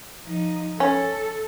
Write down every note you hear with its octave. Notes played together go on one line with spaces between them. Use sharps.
F3 D#4
C#4 A4